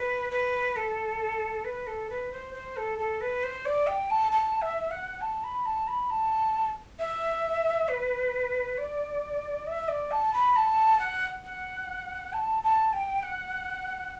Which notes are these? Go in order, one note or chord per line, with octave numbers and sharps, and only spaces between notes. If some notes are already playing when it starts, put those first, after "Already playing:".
Already playing: B4
B4
A4
B4
A4
B4
C5
C5
A4
A4
B4
C5
D5
G5
A5
A5
E5
F#5
A5
B5
A5
B5
A5
E5
B4
D5
E5
D5
A5
B5
A5
F#5
F#5
A5
A5
G5
F#5